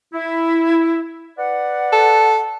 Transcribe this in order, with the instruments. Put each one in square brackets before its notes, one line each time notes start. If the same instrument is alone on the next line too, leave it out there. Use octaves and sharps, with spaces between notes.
[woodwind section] E4
B4 D5 F#5
[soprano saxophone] A4